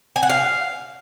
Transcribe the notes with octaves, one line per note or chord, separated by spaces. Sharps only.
G#5
F#5
F5